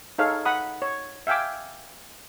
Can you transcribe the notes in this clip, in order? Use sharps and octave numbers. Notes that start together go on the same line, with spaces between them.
D#4 G#4 A4 C#5 F5
F#5 B5 D#6
C#5
E5 F5 G5 G#5 D6